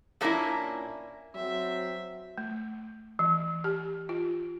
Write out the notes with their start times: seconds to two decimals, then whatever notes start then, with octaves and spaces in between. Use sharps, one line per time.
0.21 A#2 A3 A#3 C#4 D4 E4
1.35 F#3 C4 E5
2.38 A3
3.19 E3
3.64 G4
4.09 F4